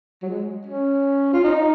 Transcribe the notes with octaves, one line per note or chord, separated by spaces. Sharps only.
F#3
G#3
C#4
F4
D#4